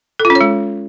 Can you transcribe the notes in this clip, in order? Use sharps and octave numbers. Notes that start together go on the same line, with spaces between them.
A4
F4
C#4
C#5
G#3